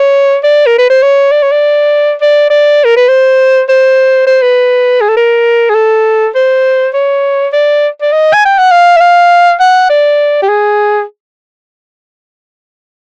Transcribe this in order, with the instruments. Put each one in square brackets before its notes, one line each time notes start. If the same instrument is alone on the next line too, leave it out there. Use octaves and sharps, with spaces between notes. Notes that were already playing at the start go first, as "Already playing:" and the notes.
Already playing: [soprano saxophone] C#5
D5
A#4
B4
C5
C#5
D5
C#5
D5
D5
D5
A#4
B4
C5
C5
C5
B4
G#4
A4
A#4
G#4
A4
C5
C#5
D5
D5
D#5
G#5
G5
F#5
F5
E5
F5
F#5
D5
G4
G#4